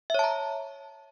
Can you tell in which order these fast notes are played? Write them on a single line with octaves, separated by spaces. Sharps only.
E5 C#5 A5 A#5